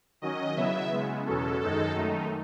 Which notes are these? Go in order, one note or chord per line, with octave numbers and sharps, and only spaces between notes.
D#3 F#3 C#4 D#5
C#3 F#3 B3 E4 E5
C#3 G#3 B3
E2 B2 F#3 C#4 A4
F#2 D#3 G#3 D#4 A4
F#2 D#3 A3 D#4